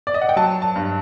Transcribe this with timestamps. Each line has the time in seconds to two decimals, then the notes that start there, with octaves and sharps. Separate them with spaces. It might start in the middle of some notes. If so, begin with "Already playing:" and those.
0.07 D5
0.14 D#5
0.22 F#5
0.29 G5
0.36 F#3 A5
0.62 A5
0.76 G2